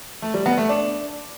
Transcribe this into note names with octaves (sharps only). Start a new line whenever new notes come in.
A3
G3
B3
A3
D4